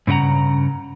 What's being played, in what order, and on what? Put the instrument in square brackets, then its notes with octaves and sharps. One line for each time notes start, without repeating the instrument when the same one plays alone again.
[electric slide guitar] G2 C#3 A3 F#5 A#5